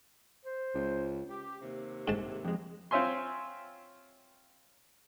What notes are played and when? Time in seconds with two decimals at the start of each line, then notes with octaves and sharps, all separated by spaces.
0.45 C5
0.74 C#2
1.30 G4
1.61 D#2 C3
2.08 G#2 A5
2.45 F2 G#3
2.91 C4 F4 C#5 E5 G#5 C6